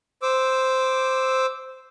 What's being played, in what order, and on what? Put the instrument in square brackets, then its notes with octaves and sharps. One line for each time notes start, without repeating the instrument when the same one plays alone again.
[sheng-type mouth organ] C5 D6 E6